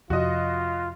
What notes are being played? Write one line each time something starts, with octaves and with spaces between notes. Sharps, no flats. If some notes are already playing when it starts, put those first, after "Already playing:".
F2 C3 F4 F#4 D#5